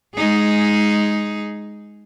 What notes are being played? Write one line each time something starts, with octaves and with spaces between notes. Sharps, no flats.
G#3 D#4 G#4